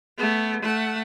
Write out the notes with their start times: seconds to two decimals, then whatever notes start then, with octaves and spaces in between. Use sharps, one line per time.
0.18 A3 B3
0.62 A3 F#5